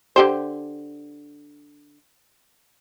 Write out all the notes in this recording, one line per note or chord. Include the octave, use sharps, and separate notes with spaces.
D3 G4 C5